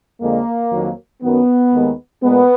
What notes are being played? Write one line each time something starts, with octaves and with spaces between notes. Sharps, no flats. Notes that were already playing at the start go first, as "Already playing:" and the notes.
F2 D3 G#3 A#3
F2 D#3 F#3
F#2 D#3 F#3 B3
D#2 D#3 G#3
A#2 G#3 B3